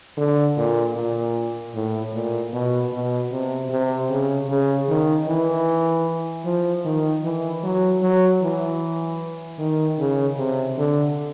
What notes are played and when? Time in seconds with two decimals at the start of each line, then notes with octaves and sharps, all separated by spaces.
0.17 D3
0.57 A#2
0.96 A#2
1.74 A2
2.14 A#2
2.53 B2
2.93 B2
3.32 C3
3.70 C3
4.10 C#3
4.50 C#3
4.89 D#3
5.28 E3
6.45 F3
6.85 D#3
7.23 E3
7.64 F#3
8.03 F#3
8.42 E3
9.59 D#3
9.99 C#3
10.38 C3
10.78 D3